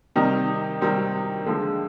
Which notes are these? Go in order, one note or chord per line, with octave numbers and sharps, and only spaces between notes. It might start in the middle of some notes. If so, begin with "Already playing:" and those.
C3 D#3 G3 C4 D#4
C3 D#3 G3 C4 D#4
D3 F3 G#3